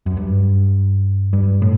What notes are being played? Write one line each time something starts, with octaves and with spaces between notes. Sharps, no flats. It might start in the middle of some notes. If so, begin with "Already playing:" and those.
F#2
G2
G2
A2